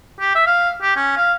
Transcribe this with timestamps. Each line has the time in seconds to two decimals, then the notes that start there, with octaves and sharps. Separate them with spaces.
0.20 G4
0.35 E5
0.47 F5
0.82 G4
0.96 C#4
1.17 F5